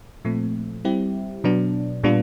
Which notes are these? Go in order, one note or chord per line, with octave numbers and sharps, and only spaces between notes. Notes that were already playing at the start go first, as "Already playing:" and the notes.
A#2 F3 A3 C4
G3 C4 E4 G4
B2 F#3 B3 D4
A#2 G3 B3 D4 F4